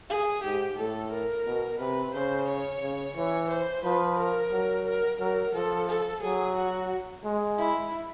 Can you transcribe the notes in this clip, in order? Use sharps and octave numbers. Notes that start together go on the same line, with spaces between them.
G#4
G#2 G4
A2 A4
A#4
B2
C3 B4
C#3 C5
C#5
C#3
E3 C#5
C5
F3 B4
A#4
F#3
A#4
F#3 A#4
F3 A4
A4
F#3 G#4
F#4
G#3
E4